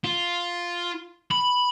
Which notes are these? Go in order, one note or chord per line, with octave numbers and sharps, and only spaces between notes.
F4
B5